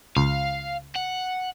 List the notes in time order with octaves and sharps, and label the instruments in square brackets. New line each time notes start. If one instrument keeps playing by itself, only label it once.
[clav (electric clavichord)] C#2 [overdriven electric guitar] F5
[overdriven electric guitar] F#5